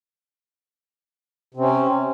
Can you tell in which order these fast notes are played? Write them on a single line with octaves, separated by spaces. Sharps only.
C3 C4 C#4